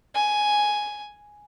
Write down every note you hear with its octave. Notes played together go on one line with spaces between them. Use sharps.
G#5